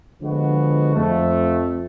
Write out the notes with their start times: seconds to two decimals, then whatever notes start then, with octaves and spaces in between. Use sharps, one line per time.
0.20 D3 F3 G#3 B3 F#4
0.95 F2 F3 A3